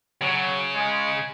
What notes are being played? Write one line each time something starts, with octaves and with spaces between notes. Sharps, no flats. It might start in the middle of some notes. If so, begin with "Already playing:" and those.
C#3 F#3
G#3